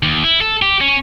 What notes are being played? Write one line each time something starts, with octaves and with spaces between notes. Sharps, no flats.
D#2
E4
A4
G4
C#4